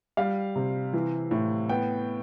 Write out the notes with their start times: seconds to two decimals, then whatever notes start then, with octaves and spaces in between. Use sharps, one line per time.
0.17 G3 F5
0.56 C3
0.93 E3
1.31 A2
1.69 B3 G5